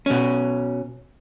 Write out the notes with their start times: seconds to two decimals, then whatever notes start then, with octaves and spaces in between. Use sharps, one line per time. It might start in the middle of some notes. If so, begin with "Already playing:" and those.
0.06 B2 C#4